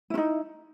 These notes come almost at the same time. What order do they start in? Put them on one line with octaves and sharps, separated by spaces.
E4 C#4 D#4